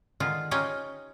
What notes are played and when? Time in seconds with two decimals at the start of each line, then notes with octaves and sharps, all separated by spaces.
0.20 D3 D#3 G#3 F4
0.51 C#4 D#4 F4 G4 C#5 D#5